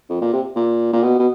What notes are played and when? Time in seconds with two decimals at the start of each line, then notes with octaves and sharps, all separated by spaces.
0.09 F2
0.21 A#2
0.33 C3
0.56 A#2
0.93 A#2
1.03 B2
1.19 B2